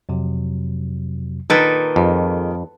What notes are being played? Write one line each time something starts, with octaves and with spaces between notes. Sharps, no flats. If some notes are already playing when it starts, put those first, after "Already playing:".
F2 C3 F#3
A#2 D#3 A4 B4
F2 G#4 D#5